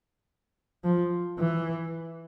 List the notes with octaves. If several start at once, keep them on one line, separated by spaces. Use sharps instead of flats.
F3
E3